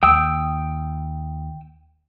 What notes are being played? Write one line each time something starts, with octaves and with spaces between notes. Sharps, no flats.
D#2 G5 D#6 E6